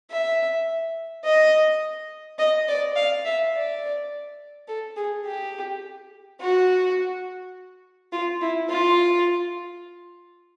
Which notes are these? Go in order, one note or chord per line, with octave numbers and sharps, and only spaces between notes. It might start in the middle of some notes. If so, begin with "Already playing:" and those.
E5
D#5
D#5
D5
F5
E5
D5
A4
G#4
G4
F#4
F4
E4
F4